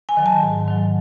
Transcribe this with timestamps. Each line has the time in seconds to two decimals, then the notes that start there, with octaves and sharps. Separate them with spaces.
0.09 G#5
0.17 D#3 F#3
0.26 A5
0.43 G#2
0.68 D#3 F#3